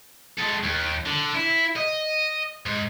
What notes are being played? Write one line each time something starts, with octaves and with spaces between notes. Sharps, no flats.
G#3 A4
D#2
D3
E4
D#5
G#2